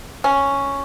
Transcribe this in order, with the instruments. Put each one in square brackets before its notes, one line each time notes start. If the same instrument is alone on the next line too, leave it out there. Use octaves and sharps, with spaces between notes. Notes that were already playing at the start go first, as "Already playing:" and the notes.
[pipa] C#4